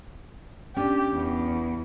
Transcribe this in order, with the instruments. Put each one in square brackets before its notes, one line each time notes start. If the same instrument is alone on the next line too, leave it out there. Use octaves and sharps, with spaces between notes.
[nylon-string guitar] C#4 D4 [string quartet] G4
[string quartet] E2